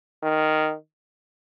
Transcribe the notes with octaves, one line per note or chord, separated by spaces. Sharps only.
D#3